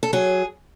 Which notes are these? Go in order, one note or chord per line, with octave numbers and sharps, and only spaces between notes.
A4
F#3 G#4